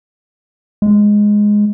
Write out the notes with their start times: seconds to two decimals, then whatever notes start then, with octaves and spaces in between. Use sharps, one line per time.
0.82 G#3